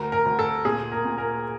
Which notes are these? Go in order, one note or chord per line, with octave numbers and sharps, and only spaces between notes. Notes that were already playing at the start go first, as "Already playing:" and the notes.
Already playing: D2 A#4
A#4
D2
A4
A#2 G#4
A#4
A#2
A#4